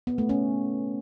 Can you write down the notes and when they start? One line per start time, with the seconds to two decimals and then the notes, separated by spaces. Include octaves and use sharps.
0.07 B3
0.18 A3
0.29 C#4